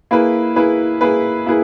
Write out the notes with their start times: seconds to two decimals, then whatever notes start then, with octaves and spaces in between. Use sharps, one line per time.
0.11 A#3 E4 G#4 B4
0.56 A#3 E4 G#4 B4
1.01 A#3 E4 G#4 B4
1.46 A#3 E4 G#4 B4